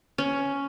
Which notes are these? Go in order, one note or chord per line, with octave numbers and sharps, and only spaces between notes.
C#4